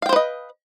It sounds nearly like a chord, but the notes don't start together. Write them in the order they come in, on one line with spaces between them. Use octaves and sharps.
F5 G5 C5 B4 D#5